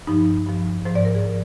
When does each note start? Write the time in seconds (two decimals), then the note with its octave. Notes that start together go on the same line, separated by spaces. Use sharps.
0.07 G2 F3 D#4
0.46 G2 F3
0.85 G#2 F3 C5
0.95 D5
1.05 A#4
1.15 G#4
1.24 F3